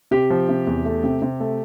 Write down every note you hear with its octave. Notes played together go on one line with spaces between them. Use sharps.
C3 G4
F3
C3
E2
A3
C3
C3
A3